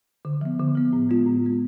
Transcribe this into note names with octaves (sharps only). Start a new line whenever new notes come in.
D3
F3 B3
D3
F3 B3
A2
G#3 B3 F4
A2
G#3 B3 F4